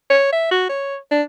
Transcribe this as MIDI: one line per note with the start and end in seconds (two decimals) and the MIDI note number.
0.10 0.30 73
0.33 0.50 76
0.51 0.68 66
0.69 0.97 73
1.11 1.22 62